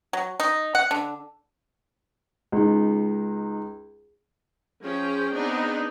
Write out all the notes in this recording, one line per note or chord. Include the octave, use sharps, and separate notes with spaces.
F#3
D#4
F#5
D3
C#2 D#4
F3 C#4 G#4 G5
B3 C4 D4 D#4 G#4